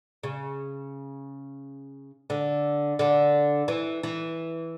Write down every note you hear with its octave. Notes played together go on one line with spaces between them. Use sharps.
C#3
D3
D3
E3
E3